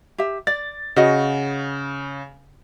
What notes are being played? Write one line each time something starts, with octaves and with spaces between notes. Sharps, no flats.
G4 E5
D5 A6
C#3 F#4 D#5 F#5